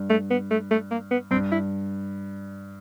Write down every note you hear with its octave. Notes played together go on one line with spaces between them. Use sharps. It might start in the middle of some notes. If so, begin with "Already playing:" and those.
Already playing: G2
A3
B3
A3
A3
A#3
B3
G2 C4
E4